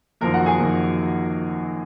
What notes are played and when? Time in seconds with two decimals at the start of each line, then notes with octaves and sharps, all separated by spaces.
0.21 G#1 F#2 F3 A#3 A#4 A#5
0.34 F#4 F#5
0.46 G#4 G#5
0.59 G#1 F#2 F3 A#3